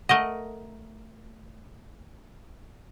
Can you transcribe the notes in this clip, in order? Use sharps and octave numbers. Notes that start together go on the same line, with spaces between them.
A3 A#4 D#5 F#5